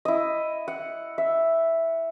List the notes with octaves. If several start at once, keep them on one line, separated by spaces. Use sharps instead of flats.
E4 D#5
F#5
E5